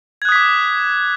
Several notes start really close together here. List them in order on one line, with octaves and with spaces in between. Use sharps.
G#6 F#6 D#6 B6 D6